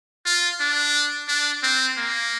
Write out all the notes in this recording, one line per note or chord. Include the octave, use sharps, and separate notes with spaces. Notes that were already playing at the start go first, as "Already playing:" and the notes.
F4
D4
D4
C4
A#3